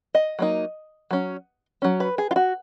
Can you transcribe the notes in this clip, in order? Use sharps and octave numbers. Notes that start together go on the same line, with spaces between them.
D#5
F#3 A#3 D#4
F#3 C#4
F#3 C#4
B4
G#4
F4
F#4